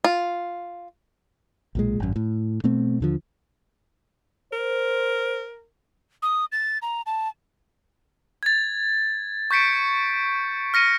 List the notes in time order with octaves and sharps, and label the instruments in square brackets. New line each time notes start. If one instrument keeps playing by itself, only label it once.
[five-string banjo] F4
[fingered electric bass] B1 A#2 G#3
G#1 F#2
A2
B2 A3 C4
D#2 D3 F3
[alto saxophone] A#4 [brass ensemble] C5
[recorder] D#6
A6
A#5
A5
[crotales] G#6 A6
C#6 G6 B6 C#7 D7
F6 A#6 C#7 D#7